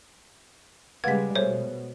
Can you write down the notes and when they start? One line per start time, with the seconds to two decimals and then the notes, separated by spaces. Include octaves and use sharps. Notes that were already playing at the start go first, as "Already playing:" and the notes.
1.04 C#3 G3 G#3 B4 F5 F#5 G#6 B6
1.35 B2 G3 A4 C5 C#5